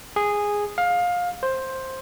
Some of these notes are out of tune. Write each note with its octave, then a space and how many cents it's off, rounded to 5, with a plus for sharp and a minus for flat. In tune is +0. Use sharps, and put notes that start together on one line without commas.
G#4 -10
F5 +20
C5 +10